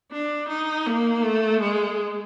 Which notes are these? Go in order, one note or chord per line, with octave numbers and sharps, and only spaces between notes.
D4
D#4
A#3
A3
G#3